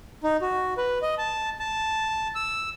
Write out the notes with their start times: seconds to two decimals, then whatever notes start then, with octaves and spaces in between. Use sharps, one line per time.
0.23 D#4
0.42 F#4
0.78 B4
1.02 D#5
1.18 A5
1.59 A5
2.35 E6